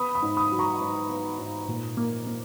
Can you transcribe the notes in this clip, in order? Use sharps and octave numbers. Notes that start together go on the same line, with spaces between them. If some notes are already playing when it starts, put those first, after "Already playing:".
Already playing: B3 B5 D#6
B5 D#6
G#2
B5 D#6
F#3
A#5 C#6
G#2
B3
G#2
A#2
A#3
A#3